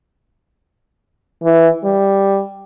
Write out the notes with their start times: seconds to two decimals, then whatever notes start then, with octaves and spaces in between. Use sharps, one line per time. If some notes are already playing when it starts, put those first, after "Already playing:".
1.43 E3
1.84 G3